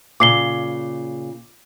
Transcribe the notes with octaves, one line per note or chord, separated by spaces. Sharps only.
A#2 C#3 D6 C7 G7